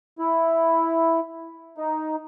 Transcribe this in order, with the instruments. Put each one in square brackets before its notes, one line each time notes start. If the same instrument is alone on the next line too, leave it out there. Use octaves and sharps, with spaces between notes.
[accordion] E4
D#4